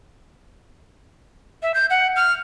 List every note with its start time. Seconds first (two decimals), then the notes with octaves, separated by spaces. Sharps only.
1.63 E5
1.74 G6
1.90 F#5
2.16 F6